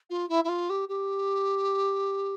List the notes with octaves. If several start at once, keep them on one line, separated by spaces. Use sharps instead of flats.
F4
E4
E4
F4
G4
G4